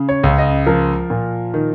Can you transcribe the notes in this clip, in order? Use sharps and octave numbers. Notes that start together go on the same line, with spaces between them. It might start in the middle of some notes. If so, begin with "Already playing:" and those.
Already playing: C#3
C#5
C#2
D#5
F3 A#4
A#2
D#3